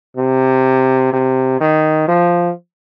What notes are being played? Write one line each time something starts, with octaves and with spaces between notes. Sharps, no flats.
C3
C3
D#3
F3